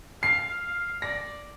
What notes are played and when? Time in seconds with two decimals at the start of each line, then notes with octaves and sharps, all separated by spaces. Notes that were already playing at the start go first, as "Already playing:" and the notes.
0.22 F5 C7
0.62 F5
1.02 D5 A#6